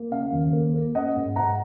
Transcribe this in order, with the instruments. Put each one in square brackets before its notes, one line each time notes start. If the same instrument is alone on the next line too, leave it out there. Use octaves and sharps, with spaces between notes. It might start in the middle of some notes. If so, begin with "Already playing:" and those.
Already playing: [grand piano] A#3
C#3 F5
D#2
A#3
A#3
C#4 D#5 F#5
G#2
G#2 F#5 A#5